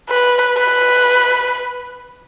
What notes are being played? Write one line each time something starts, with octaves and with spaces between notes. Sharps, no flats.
B4
B4